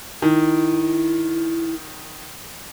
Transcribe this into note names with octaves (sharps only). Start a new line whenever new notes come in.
D#3 E4